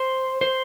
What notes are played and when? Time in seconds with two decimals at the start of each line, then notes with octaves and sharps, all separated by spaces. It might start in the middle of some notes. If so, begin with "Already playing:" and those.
Already playing: C5
0.41 C5